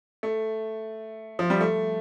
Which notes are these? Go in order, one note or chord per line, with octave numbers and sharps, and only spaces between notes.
A3
F3
G3
A3